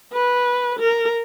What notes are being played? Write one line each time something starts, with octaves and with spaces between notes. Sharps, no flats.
B4
A#4